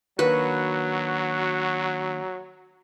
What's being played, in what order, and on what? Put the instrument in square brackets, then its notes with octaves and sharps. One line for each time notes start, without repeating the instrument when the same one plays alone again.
[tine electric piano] D#3 A#3 D4 [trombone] F#3 [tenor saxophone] F#4 [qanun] B4